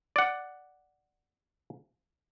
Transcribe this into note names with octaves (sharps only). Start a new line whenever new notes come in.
D5 F#5